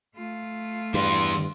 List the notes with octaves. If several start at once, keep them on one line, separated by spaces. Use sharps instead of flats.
A3 F4
G2 E3 B3 C6